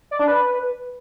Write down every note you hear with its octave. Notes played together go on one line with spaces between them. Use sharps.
D5
D4
B4